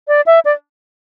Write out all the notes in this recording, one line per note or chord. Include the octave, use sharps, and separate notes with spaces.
D5
E5
D5